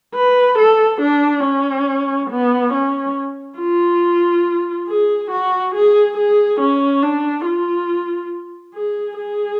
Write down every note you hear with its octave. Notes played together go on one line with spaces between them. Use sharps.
B4
A4
D4
C#4
B3
C#4
F4
G#4
F#4
G#4
G#4
C#4
D4
F4
G#4
G#4